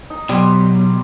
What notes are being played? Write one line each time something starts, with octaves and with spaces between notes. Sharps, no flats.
D#4
B2 F#3 G3 C6